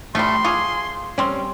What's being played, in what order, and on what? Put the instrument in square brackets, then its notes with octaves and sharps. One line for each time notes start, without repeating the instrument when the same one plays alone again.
[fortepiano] A2 [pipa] G3 A3 [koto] F4 [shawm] C6
[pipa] F4 G#4 [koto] C#5 [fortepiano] D6
[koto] G3 C4 [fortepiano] C#4 C6